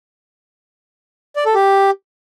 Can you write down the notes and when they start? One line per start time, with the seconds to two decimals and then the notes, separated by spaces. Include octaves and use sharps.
1.36 D5
1.45 A4
1.55 G4